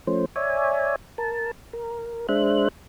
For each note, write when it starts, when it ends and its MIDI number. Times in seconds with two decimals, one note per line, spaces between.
0.07 0.25 53
0.07 0.25 57
0.07 0.25 61
0.07 0.25 72
0.36 0.96 73
0.36 0.96 74
0.36 0.96 76
0.36 0.96 80
1.18 1.51 70
1.18 1.51 81
1.73 2.27 70
2.29 2.68 56
2.29 2.68 62
2.29 2.68 72
2.29 2.68 76
2.29 2.68 90